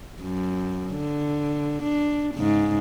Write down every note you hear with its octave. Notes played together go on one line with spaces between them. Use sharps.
F#2
D3
D4
G#2 C#3